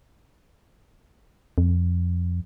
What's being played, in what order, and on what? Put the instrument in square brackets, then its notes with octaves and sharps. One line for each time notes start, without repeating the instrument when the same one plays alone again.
[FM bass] F2